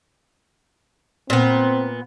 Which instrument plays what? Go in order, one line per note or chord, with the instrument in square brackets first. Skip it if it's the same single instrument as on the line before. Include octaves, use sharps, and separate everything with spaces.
[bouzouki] A#2 B3 [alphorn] C4